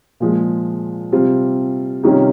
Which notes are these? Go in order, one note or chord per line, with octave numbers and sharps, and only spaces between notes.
A#2 F3 G#3
C3 G3 C4 F4
C3 D#3 G3 C#4 F4